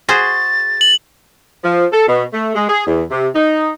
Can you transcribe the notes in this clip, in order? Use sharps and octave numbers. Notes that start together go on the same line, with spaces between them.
F#4 G#4 C5 A6
F#7
F3
A4
B2
A3
G#3
G#4
E2
C3
D#4